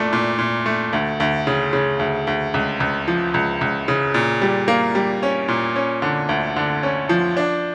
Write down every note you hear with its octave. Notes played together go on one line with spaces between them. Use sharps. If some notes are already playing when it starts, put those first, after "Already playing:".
Already playing: A#2 A3 D4
A#2
A#2
A3
D2
D2
C#3
C#3
D2
D2
C#2
C#2
F3
C#2
C#2
C#3
A#2
G3
A#3
G3
C#4
A#2
C#4
D3
D2
D3
C#4
F3
D4